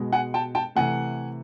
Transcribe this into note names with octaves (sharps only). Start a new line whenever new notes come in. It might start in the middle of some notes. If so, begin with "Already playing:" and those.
Already playing: B2 G#3
F#5 G#5
G5 A5
G5 A5
C3 E3 A3 F#5 G#5